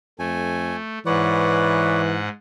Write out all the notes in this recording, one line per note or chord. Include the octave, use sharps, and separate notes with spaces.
F2 A3 G#5
G#2 E3 B4 C#5 D5 F#5